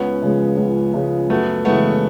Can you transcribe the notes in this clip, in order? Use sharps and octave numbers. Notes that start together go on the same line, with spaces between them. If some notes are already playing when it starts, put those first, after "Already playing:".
Already playing: C#2 B3 C#4
C#3 F3 G#3
C#2
C#3 F3 G#3
F#2 A3 B3
C#3 E3 G#3 A3 B3